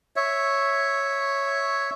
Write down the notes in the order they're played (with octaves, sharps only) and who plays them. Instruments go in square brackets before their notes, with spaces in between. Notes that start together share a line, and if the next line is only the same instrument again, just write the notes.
[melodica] C#5 E5